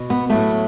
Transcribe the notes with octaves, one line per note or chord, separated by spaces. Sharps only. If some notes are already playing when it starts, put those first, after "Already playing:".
Already playing: B2
B3
A2 F#3 A3 B3